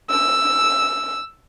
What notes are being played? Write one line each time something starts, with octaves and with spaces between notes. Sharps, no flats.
E6